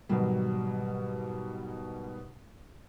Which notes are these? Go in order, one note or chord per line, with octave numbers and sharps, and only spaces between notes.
G#2 B2 D#3 F#3 G3